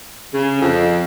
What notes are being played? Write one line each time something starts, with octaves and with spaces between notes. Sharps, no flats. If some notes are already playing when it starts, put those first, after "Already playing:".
C#3
F2